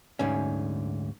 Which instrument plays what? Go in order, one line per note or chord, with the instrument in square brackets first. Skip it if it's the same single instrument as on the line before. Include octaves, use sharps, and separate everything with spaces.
[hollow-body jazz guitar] D2 G#2 C#4